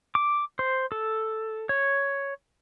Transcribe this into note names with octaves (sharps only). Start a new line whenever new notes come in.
D6
C5
A4
C#5